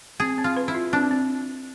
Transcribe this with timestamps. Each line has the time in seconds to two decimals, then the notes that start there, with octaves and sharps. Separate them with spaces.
0.20 C4 G#4
0.38 C4
0.44 F4
0.57 B4
0.68 E4
0.75 F4
0.93 C4 D4
1.11 C4